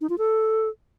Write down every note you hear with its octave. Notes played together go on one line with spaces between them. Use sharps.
D#4
F4
A4